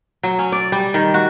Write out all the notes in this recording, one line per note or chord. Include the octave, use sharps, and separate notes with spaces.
F#3
C#4
D5
G3
D#3
F#4